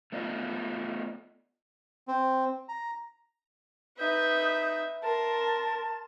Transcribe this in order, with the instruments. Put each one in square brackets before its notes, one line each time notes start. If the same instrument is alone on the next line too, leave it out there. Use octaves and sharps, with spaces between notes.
[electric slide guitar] A3 B3 F4 D5 D#5
[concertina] C4
A#5
[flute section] D#4 D#6 G6 [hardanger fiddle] B4 E5
[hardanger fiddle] A#4 [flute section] A5 C6